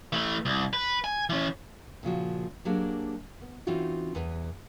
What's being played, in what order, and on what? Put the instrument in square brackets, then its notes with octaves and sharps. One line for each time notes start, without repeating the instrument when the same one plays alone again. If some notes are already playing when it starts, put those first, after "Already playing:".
[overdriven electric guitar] E3 A3
C2
B4
G#5
E3 C#4
[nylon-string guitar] A#2 C#3 F3 F#4
F#3 A#3 D4 G4 G#4
B3
E3 C4 C#4 D#4 F4 F#4
E2 B3 B4